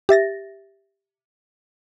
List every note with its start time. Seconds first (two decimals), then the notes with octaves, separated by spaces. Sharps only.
0.09 G4 E5 A6 A#6